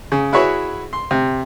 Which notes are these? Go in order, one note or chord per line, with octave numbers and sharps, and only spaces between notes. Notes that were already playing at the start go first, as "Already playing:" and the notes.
C#3
E4 F#4 G#4 B4 C#5 E5
C6
C3